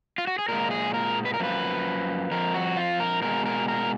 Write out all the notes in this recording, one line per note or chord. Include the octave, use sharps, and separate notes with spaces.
F4
F#4
G#4
A#2 G#3 A#4
G#4
A#4
B4
A#4
F#2 F3 A#3 B4
F2 F3 A#4
F#4
F4
A#4
B2 G#3 A#4
A#4
A#4